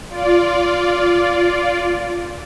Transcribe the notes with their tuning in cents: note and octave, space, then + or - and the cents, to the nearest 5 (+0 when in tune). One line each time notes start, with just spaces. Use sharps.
F4 +0 D5 -15